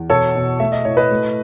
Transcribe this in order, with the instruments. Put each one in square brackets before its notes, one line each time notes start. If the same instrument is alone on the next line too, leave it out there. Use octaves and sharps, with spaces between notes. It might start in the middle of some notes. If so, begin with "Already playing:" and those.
Already playing: [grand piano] E2
B2 A4 C#5
B2
A3 E5
D#5
A2 C#5
B4 D#5
A3